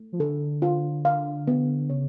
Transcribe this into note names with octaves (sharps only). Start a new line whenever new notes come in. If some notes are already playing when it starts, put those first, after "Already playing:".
Already playing: A3
F3
D3 A4
F4
F5
B3
C#3 C#5